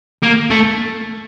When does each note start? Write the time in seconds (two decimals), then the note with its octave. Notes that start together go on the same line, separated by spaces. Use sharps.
0.23 A#3
0.50 A3